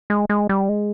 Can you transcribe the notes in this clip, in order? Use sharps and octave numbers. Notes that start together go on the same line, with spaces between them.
G#3
G#3
G3
G#3